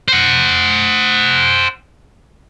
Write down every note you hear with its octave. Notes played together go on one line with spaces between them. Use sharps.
C5 F#5